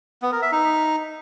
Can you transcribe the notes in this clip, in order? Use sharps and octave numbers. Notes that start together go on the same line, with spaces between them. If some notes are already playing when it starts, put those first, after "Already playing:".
B3
A#4
E5
D#4